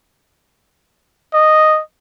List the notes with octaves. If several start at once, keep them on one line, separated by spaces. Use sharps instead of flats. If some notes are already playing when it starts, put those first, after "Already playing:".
D#5